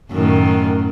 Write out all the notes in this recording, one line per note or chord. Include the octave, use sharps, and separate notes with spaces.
F#2 A2 D#3